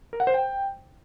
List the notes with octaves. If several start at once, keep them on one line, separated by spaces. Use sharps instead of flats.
A#4
F#5
C5
G5